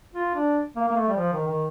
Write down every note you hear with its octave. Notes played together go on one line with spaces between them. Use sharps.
F4
D4
A#3
A#3
A3
G3
F3
D#3
D#3